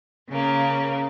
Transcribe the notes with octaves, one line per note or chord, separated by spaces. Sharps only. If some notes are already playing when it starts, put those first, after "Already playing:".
C#3 A#3